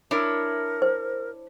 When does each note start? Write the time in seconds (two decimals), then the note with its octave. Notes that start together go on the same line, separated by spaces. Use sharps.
0.11 D4 E4 A#4 C#5
0.82 C5